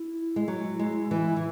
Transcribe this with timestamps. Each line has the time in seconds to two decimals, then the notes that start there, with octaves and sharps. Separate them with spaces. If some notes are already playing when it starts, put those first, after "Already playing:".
Already playing: E4
0.36 G#3
0.48 F#3
0.79 G#3
1.11 E3
1.37 E3